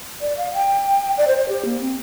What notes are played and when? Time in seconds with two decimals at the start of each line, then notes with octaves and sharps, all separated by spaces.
0.21 D5
0.37 F5
0.54 G5
1.18 D5
1.28 C5
1.38 C5
1.49 G4
1.65 A#3
1.81 C4